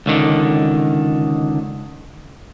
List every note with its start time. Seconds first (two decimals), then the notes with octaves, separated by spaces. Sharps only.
0.06 C#2 D3 D#3